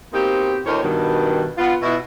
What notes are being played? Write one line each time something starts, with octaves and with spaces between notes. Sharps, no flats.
B2 A#3 C4 D#4 G4 C5
D2 A2 D#3 C5 C#5
G2 B2 D#3
B3 F4
B2 E4